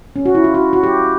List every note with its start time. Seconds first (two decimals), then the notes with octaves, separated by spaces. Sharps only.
0.16 C#4
0.26 F#4
0.35 E4
0.44 F4
0.54 F#4
0.73 F#4
0.83 G4